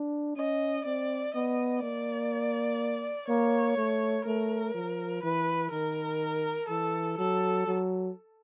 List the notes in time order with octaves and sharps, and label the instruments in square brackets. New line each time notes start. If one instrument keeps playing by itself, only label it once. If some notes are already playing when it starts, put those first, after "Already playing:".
Already playing: [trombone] D4
[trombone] C#4 [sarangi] D#5
[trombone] C4 [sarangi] D5
[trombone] B3 [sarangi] D#5
[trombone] A#3 [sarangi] D5
[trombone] A#3 [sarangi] C#5
[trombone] A3
[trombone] A3 [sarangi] A#4
[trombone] F3
[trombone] E3 [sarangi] B4
[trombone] D#3 [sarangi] A#4
[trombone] E3 [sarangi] A4
[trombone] F#3 [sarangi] A4
[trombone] F#3